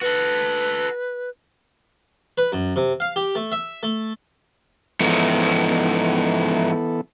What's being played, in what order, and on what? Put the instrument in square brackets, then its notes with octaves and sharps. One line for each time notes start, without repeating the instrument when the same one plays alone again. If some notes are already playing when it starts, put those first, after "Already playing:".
[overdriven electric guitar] F#4 A4 [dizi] B4
[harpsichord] B4
F#2
C3
F5
G4
A3
E5
A3
[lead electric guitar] G#2 F3 [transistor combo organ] E3 B3 A4